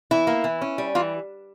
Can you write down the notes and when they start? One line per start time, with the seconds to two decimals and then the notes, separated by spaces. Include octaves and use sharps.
0.11 E3 E4
0.27 A#3
0.44 E3
0.61 C#4
0.78 G3
0.95 E3 F4